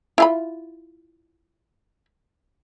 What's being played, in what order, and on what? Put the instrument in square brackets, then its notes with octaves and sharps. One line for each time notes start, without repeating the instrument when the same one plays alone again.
[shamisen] E4 F4 B5